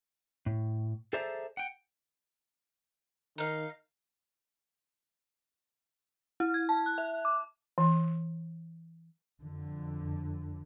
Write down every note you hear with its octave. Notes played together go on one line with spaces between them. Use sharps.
A2
G#4 A4 C5 D5 E5 A#5
F#5 G5
D#3 D#4 F5
E4
G#6
A5
F#6
E5
D6
E3
F2 D3